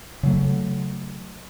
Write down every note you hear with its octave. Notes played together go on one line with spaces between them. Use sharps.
C#3 F#3 A3